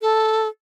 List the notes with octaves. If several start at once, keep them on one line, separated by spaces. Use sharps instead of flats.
A4